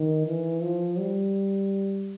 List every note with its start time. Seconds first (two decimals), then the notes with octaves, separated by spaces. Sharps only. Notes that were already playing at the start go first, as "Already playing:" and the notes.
Already playing: D#3
0.27 E3
0.62 F3
0.99 G3